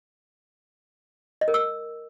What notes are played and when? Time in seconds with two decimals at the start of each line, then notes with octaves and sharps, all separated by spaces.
1.41 D#5
1.48 A#4
1.54 E6